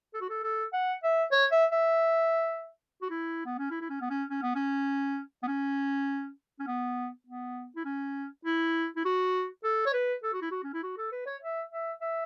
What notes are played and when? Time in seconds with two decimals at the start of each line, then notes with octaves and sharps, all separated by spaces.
0.14 A4
0.21 F#4
0.30 A4
0.44 A4
0.73 F#5
1.03 E5
1.32 C#5
1.52 E5
1.72 E5
3.02 F#4
3.10 E4
3.46 B3
3.58 C#4
3.70 E4
3.81 E4
3.90 C#4
4.01 B3
4.10 C#4
4.29 C#4
4.43 B3
4.55 C#4
5.43 B3
5.48 C#4
6.59 C#4
6.67 B3
7.27 B3
7.76 E4
7.85 C#4
8.45 E4
8.96 E4
9.05 F#4
9.64 A4
9.86 C#5
9.93 B4
10.23 A4
10.33 F#4
10.42 E4
10.51 F#4
10.64 C#4
10.74 E4
10.83 F#4
10.98 A4
11.12 B4
11.27 C#5
11.42 E5
11.72 E5
12.01 E5